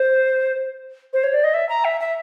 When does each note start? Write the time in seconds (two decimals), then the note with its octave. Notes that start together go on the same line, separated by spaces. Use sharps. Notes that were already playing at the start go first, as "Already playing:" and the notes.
Already playing: C5
1.13 C5
1.23 C#5
1.33 D5
1.43 D#5
1.53 E5
1.68 A#5
1.84 E5
2.00 E5